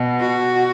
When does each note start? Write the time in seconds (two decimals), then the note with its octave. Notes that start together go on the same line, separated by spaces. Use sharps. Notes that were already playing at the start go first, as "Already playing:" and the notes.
Already playing: B2
0.20 F#4